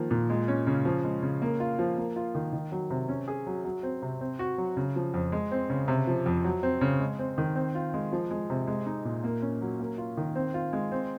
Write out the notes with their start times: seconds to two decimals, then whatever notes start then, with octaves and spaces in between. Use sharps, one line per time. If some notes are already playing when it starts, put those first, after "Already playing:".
Already playing: D#3 F3 A#3
0.11 A#2
0.30 G#3
0.48 C#4
0.67 C#3
0.85 F3
1.04 G#3
1.23 C#3
1.42 A#3
1.60 F4
1.79 F3
1.97 A#3
2.16 F4
2.35 D#3
2.53 D#3
2.72 F#3
2.90 C3
3.09 C#4
3.28 G#4
3.47 F#3
3.65 F#3
3.83 C4
4.02 C3
4.21 C4
4.39 F#4
4.58 F#3
4.77 C#3
4.96 F3
5.14 F2
5.32 G#3
5.51 C4
5.70 C#3
5.88 C3
6.07 F3
6.26 F2
6.44 F#3
6.63 C4
6.81 C#3
7.00 G#3
7.19 C4
7.38 D#3
7.55 C4
7.75 F4
7.94 G#3
8.12 F3
8.31 G#3
8.50 C3
8.67 G#3
8.86 D#4
9.05 A#2
9.24 A#3
9.42 C#4
9.61 F#3
9.80 A#3
9.98 F4
10.17 D#3
10.35 C4
10.54 F4
10.73 G#3
10.92 C4